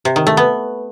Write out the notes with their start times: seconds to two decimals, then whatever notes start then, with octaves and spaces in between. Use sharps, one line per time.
0.05 C3
0.16 D#3
0.27 A3
0.37 B3